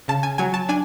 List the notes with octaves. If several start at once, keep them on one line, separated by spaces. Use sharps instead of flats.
C#3 A5
G#5
F#3 G#5
A5
D4 G#5